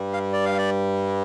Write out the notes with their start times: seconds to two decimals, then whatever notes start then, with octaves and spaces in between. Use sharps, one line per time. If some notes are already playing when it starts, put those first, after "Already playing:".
Already playing: G2 G3
0.13 F5
0.33 D5
0.45 F5
0.58 D5